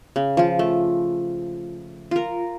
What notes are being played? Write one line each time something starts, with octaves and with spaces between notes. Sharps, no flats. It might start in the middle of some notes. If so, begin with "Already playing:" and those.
C#3
F3 F4
A3
F4 A#4